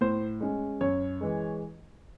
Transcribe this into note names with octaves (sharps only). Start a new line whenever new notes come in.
A2 C5
G#3 C#4
F#2 C#5
E3 G#3